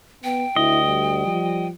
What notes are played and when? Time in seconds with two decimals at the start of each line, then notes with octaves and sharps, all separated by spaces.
0.24 B3 G5
0.56 D2 E4 D#5
0.87 G3
1.27 F3